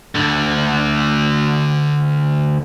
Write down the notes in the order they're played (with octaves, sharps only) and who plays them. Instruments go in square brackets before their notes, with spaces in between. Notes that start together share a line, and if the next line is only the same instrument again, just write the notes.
[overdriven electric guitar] D2 D3